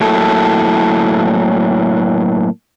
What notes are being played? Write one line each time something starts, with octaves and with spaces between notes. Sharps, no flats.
A2 F#3 A#3 E4 A4